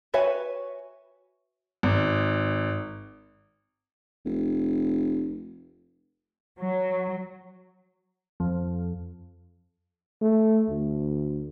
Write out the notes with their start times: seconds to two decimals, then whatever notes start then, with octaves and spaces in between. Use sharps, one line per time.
0.14 F#4 B4 C#5 E5 G#5
1.83 G#1
4.25 F1
6.59 F#3
8.40 F2
10.21 A3
10.69 D2